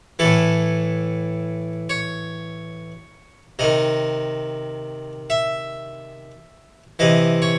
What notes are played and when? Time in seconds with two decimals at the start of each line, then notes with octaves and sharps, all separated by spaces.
0.19 A2 E3 A4
1.90 C#5
3.59 C3 D#3 D#5
5.30 E5
6.99 C3 E3 D#5
7.42 C#5